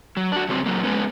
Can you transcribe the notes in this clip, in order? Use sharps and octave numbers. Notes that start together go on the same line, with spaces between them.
F#3
D4 F#4
C#3 F#3 G3 C4
A#2 F#3 A#3
G#3 B3 C#4